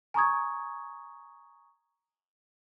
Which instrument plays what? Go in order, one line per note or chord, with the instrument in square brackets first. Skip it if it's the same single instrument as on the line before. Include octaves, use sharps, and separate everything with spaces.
[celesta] G#5 A#5 C#6 D#6 G#6